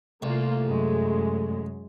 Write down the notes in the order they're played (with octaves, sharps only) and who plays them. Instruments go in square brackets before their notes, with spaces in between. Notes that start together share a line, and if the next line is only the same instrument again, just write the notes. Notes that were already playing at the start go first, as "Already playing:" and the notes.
[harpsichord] C2 [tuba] A3 [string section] A#3 F4
[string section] F#2 G#3